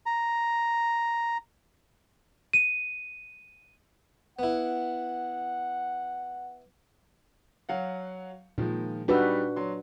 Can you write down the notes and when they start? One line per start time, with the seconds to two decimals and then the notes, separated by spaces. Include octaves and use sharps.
0.06 A#5
2.53 D#7
4.39 B3 E4 F#5
7.69 F#3 F5 F#5
8.58 A#2 D#3 F3 G#3
9.08 G3 D4 D#4 F#4 B4 E6
9.56 F#3 C6